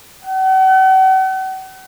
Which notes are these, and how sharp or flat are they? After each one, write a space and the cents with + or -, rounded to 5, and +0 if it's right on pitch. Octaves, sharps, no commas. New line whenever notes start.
F#5 +40